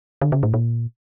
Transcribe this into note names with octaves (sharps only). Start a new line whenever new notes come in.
D3
C#3
A2
A#2